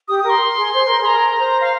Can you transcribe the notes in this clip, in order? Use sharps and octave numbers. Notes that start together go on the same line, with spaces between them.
G4 D#6
A#4 D#6
C6
G#4
C5
A#4
G#4
A#5
A#4
C5
F5